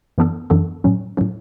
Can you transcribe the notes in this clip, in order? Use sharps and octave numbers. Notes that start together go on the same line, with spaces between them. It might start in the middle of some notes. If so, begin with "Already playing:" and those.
F#2 E3 B3 D4 A4
F#2 E3 B3 D4 A4
A2 F#3 C#4
A2 F#3 C#4